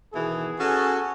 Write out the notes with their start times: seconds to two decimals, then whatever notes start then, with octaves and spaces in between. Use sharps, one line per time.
0.13 B2 D#3 E3 G#4
0.59 C#4 F#4 A4